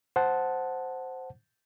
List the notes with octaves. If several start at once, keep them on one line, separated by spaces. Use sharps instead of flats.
C5 F#5 A5